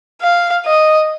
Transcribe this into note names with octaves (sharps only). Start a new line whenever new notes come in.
F5
D#5